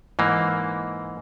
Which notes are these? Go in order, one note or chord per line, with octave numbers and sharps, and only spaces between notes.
G#2 E3 A#3